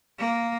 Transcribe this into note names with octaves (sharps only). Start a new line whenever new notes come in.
A#3